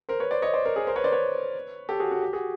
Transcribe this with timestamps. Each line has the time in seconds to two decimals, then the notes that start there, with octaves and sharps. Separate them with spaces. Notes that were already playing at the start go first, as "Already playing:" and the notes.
0.09 A#4 C5
0.20 B4 C#5
0.31 C5 D5
0.42 C#5 D#5
0.53 C5 D5
0.65 A#4 C5
0.76 G#4 A#4
0.87 A#4 C5
0.96 B4 C#5
1.04 C5 D5
1.12 B4 C#5
1.89 G4 A4
2.00 F#4 G#4
2.11 F#4
2.22 G4
2.33 F#4 G#4